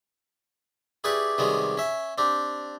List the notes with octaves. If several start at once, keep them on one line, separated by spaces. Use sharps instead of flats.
E4 G4 G#4 B4 D5 C#6
C3 D#3 G3 G#3 B3 C#4
C#4 E5
C4 D4 G4